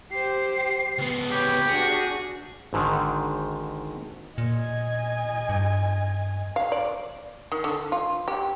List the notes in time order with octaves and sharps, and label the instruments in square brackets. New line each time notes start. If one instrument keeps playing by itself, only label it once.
[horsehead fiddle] G4 C5 [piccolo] C7
[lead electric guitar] C#2 B3
[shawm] G4 [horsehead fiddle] B4 C#5
[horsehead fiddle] D4 F#4 [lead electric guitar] G#4 [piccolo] C#7
[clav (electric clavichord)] G#1 G#2 D3 D#3
[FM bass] A#2 [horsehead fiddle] D#5 G#5
[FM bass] G2
[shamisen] F5
D5
D#3
D3
F4
G4